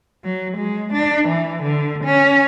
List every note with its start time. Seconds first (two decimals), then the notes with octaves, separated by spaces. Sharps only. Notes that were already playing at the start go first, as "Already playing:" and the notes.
0.24 F#3
0.58 G#3
0.93 D4
1.29 E3
1.62 D3
2.05 C#4